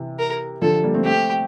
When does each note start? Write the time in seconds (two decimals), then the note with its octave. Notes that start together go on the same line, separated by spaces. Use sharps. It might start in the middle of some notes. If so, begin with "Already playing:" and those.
Already playing: C3 E3
0.19 A#4
0.62 D3 F3 A4
0.84 G3 A#3
0.94 A3 C4
1.05 A3 C4 G4